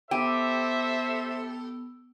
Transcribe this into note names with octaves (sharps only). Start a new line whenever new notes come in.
B3 G4 A4 C5 E5 E6